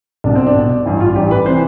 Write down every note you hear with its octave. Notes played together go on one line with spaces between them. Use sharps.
C2 B2 D4
C4
D4
C2 B2
A1 G2 E3
F4
A1 G2 E3 G4
B4
C3 E3 C5